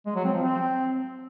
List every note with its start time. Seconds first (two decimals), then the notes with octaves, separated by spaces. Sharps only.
0.06 G#3
0.16 F#3
0.25 C4
0.34 F3
0.43 C4